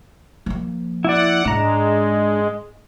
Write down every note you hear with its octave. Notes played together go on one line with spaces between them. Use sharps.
F3 A#3
E4 D5 F#5
G#2 G#3 D4 A#5